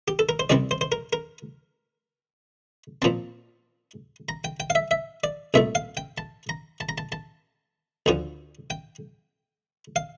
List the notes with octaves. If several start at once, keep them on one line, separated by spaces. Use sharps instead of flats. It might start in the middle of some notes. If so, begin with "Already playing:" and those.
G4
A4
A#4
C5
C2 C3 G3 C4 D5
C5
C5
A#4
A#4
A#2 F3 C4 A5
A#5
G5
G5
F5
E5
E5
D5
C2 A#2 A3 E5
F5
G5
A5
A#5
A5
A#5
A5
A5
D2 D3 F3
G5
F5